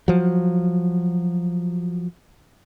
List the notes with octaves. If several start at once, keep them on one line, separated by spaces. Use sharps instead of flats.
F3 F#3